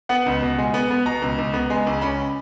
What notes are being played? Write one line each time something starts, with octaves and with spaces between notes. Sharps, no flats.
B3 F#5
C#2
B2
G#3
B3
B3
B2 A#5
C#2
C#2
B3
G#3
C#2
C#4 B5